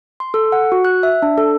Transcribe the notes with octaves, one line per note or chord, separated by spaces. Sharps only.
C6
A4
F#5
F#4
F#6
E5
D4
A4